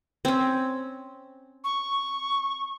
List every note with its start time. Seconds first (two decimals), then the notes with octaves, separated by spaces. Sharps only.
0.25 C4 C#4
1.64 C#6